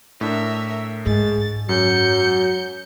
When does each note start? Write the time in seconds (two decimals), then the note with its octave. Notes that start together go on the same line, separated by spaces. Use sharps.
0.21 A2 D4 A#4 E5
1.06 G#2 G#3 A6
1.69 F#2 F#3 G6 C#7